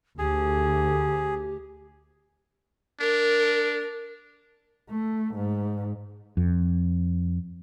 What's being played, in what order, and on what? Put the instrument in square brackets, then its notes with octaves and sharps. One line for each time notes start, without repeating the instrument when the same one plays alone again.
[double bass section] D2 [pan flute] G4 [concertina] G#4
[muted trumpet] D4 [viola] A#4
[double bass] A3
G#2
[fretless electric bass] F2